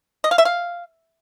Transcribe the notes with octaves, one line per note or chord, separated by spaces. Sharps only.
D#5
F5
E5
F5